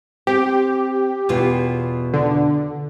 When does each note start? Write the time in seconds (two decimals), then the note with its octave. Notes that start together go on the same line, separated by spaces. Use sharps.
0.27 C4 G4
1.29 E2 B2 F4
2.14 D3